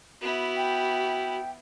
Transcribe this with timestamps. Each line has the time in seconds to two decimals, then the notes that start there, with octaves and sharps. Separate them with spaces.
0.21 B3 E4 F#4
0.55 G5